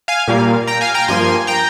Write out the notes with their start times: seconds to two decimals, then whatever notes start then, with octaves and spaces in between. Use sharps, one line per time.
0.08 F5 G#5
0.28 A#2 G3 A#3
0.67 G5 A#5
0.81 F5 G#5
0.94 G5 A#5
1.08 G2 F3 A#3 G#5 C6
1.47 G5 A#5